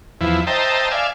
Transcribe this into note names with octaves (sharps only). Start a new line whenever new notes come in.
E2 F3 E4
C5 D#5 E5 G5 A5 A#5
D5 E5 F5 G#5